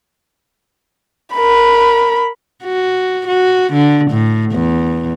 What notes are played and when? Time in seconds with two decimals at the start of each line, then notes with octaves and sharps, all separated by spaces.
1.34 A#4 B5
2.65 F#4
3.28 F#4
3.73 D3
4.11 A2
4.52 E2